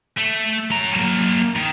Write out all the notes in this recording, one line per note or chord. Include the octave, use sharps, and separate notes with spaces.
A3
C#4 A#5
F#3 A#3
D#3